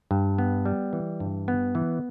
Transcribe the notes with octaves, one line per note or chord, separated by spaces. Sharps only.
G2
B3
G3
E3
G2
B3
E3